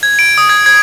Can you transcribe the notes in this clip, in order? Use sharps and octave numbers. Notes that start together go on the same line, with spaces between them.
G#6
D7
D#6
G#6
G#6